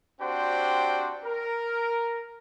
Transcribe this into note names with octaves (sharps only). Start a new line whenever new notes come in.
C4 D4 F#4 G4 C5 G5
A#4